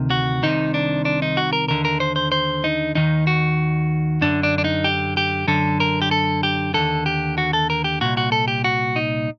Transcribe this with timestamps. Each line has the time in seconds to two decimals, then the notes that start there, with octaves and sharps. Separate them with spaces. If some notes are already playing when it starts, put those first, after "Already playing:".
Already playing: D2 C3 D#3
0.10 F#4
0.43 C2 C3 D#3 D#4
0.74 D4
1.05 D4
1.22 D#4
1.37 F#4
1.53 A#4
1.68 D#2 D3 A#4
1.85 A#4
2.00 C5
2.16 C5
2.32 C5
2.64 D#4
2.95 D#2 D#3 D#4
3.27 F#4
4.21 F#2 D3 D4
4.43 D4
4.58 D4
4.64 D#4
4.84 G4
5.17 G4
5.47 F#2 D3 A4
5.80 A#4
6.02 G4
6.11 A4
6.43 G4
6.74 D#2 D3 A4
7.06 G4
7.38 F#4
7.53 A4
7.70 A#4
7.84 G4
8.01 C2 A#2 F#4
8.17 F#4
8.32 A4
8.48 G4
8.64 F#4
8.96 D#4